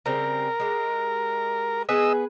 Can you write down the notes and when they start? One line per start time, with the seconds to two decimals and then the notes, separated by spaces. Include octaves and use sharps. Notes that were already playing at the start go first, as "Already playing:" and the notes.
0.06 C#3 G3 C4 A#4
0.60 G#3 G4
1.89 B3 G#4 B4 D#5 E6